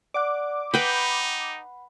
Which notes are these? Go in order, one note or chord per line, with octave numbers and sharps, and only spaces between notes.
D5 F#5 D6 F#6
D#4 B4 F#5 G5 B5